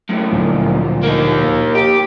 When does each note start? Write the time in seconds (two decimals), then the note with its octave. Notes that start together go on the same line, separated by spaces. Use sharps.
0.09 F#2 A2
0.31 D2 A#2 F3
1.03 A#3 D#4
1.75 G4